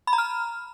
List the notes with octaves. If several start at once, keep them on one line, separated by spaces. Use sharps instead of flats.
B5
A#5
F6